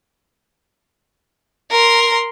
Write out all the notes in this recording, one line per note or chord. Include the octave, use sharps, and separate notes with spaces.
A#4 C6